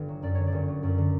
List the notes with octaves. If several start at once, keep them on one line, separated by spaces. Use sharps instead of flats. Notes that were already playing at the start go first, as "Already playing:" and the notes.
Already playing: G1 D3
F#3
F#2 D5
D3 C#5
D5
G1
F#3
F#2
D3